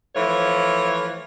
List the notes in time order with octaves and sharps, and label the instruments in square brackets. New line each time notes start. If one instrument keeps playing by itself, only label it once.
[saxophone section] E3 F3 A3 C#5